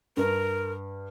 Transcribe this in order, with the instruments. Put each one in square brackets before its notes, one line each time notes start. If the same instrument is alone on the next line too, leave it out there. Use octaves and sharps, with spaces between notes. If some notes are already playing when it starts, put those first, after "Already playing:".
[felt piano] G2 [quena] A#4